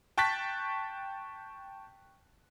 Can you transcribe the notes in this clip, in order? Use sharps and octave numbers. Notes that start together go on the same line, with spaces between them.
G5 A5 C#6 F#6 A6 B6